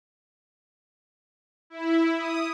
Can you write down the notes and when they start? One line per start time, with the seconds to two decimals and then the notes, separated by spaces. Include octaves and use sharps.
1.70 E4
2.17 D#6